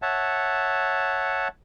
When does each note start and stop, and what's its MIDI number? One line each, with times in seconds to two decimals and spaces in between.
0.02 1.48 73
0.02 1.48 76
0.02 1.48 78
0.02 1.48 81